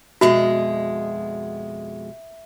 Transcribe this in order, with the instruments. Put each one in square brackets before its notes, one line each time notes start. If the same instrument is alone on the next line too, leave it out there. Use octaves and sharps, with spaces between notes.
[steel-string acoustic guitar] F2 B2 G#3 [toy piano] F#4 [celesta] E5